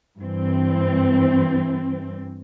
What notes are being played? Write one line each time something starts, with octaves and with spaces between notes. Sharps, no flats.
G2 E3 C4